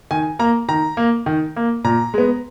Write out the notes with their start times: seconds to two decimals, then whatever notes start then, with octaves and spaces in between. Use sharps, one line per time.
0.11 D#3 G#5
0.39 A#3 A#5
0.68 D#3 A#5
0.97 A#3
1.26 D#3
1.56 A#3
1.84 A#2 A#5
2.14 G#3 B3